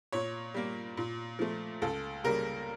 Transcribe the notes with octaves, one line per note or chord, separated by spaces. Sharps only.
A#2 C#5
G3 A#3
A#2
F3 A3
C#2 A4
C#3 G3 A#3 A#4